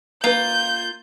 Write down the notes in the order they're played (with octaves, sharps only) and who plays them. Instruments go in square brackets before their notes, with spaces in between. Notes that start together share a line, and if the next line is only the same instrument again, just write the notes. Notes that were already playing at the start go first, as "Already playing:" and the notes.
[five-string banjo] A#3 B4 [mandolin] F4 [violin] G6